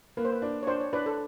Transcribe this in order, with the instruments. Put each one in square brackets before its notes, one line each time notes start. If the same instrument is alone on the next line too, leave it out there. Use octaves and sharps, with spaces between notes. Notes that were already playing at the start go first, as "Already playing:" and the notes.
[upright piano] A#3 [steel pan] B4
[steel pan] C5
B4
[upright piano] D4
[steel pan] C#5
[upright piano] D4 [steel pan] C5
[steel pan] C#5
[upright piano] D4 [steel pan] B4
[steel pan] A4